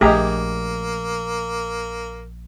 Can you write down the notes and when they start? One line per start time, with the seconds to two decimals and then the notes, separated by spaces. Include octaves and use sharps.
0.01 A#1 A3 A#3 G4 G#4 D#5 A#5